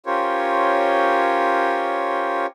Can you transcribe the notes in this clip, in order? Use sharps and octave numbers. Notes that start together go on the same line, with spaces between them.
C#4 F4 G4 A#4 C5 C#5